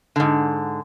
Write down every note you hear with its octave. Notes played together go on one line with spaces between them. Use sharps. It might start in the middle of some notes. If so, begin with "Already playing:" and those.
G#2 D3